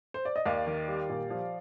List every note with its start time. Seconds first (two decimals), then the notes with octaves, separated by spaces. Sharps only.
0.14 C5
0.25 D5
0.36 D#5
0.46 D#2 D5 F5
0.67 D#3
0.88 G3
1.10 A#2
1.30 F3